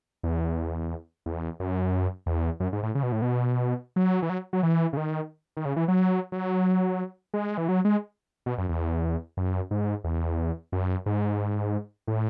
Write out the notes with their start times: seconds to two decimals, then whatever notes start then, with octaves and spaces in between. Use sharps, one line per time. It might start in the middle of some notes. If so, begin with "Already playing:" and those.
0.23 E2
1.26 E2
1.60 F#2
2.26 E2
2.60 F#2
2.73 G#2
2.83 A2
2.95 C#3
3.03 B2
3.12 A2
3.22 B2
3.96 F#3
4.22 E3
4.30 F#3
4.53 F#3
4.63 E3
4.93 C#3
4.97 D#3
5.57 D#3
5.65 C#3
5.76 E3
5.88 F#3
6.32 F#3
7.34 G#3
7.58 E3
7.68 F#3
7.85 G#3
8.46 B2
8.58 F#2
8.69 E2
9.37 F#2
9.71 G#2
10.04 E2
10.72 F#2
11.06 G#2
12.07 A2